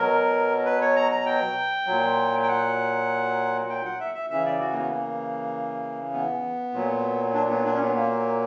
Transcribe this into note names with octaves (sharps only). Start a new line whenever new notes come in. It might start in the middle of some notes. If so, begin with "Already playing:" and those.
Already playing: B2 F#3 A#4
B4
C#5
A#5
A#5
G5
A#2 F#3
G5
F#5
G5
F#5
E5
E5
C#3 E3 E5
D5
F#4
A#3
B3
A#3
B3
A#2 F#3
D4
B3
D4
C#4
B3
A#3